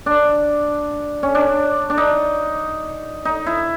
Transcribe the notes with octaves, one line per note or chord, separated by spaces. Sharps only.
D4
C#4
D4
D4
D#4
D#4
E4